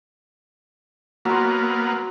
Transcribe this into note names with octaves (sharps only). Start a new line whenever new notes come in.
F#3 A#3 B3 C6